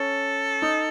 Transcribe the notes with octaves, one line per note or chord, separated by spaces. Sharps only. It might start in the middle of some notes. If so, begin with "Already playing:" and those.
Already playing: C#4 A4
D#4